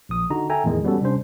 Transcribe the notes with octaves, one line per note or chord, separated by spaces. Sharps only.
A#1 D#6
D3 D#4 F#4 A#5
A4 E5 G5 G#5 A#5
E2 A2 D#3 G#3
F#3 G3 B3 C#4 F#4 A4
C3 G3 C#4 D4 C5